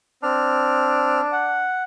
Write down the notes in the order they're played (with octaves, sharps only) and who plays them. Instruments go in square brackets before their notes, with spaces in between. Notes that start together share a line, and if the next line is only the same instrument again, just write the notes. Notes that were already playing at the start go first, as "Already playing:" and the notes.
[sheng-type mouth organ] C4 F6 [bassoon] D4
[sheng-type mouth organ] F#5